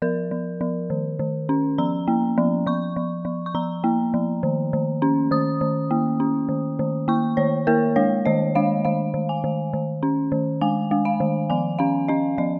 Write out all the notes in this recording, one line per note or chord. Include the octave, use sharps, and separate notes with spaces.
F3 A#4
F3
F3
D#3
D#3
C#4
F3 A#5
A#3
F3
F3 C#6
F3
F3
C#6
F3 A#5
A#3
F3
D#3
D#3
C#4
D#3 D#6
D#3
A#3
C#4
D#3
D#3
A#3 C#6
D#3 C#5
A#3 A#4
G#3 C#5
D#3 D#5
G#3 F5
D#3 F5
D#3
G#5
D#3
D#3
C#4
D#3
G#3 G#5
G#3
F5
D#3
F3 G#5
C#4 F5
C#4 D#5
F3 D#5